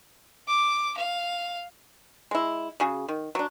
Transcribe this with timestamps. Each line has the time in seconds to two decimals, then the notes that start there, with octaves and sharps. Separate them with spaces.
0.48 D6
0.97 F5
2.31 G#3 E4
2.80 C#3 F#4 G#4
3.08 D#3
3.35 F#3 D4